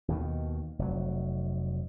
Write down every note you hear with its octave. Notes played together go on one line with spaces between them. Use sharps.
D#2 B2 D#3
F1 F#3